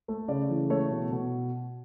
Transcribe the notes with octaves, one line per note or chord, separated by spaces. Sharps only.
A3
C#3 D5
E3
A3 C#5
B2
B2